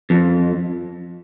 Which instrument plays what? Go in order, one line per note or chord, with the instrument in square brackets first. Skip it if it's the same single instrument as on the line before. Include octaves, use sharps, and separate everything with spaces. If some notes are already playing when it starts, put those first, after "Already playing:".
[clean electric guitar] F2